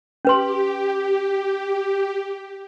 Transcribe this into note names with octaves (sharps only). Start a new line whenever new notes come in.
C#4 G4 B4 C6